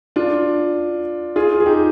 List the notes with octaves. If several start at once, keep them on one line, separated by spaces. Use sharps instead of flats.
D4 F4
F4 G#4
G#4
D#4 G4